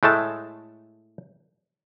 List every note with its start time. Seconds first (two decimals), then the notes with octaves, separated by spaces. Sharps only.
0.03 A2 G#3 A3 A5